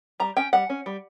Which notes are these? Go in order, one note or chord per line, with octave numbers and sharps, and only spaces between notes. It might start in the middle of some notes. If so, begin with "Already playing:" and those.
G3 A#5
C#4 G5
G3 F#5
C#4
G3